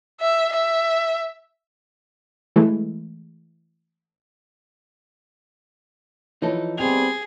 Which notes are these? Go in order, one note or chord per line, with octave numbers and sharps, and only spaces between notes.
E5
E5
E3 G#3 A3
E3 F3 D#4 A4 C#5
G3 B3 C4 G#4 F7